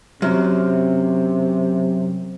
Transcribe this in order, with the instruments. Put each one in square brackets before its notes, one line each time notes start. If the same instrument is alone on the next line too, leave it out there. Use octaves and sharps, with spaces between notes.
[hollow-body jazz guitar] F#2 [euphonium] C3